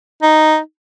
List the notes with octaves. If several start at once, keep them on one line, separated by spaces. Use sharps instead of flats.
D#4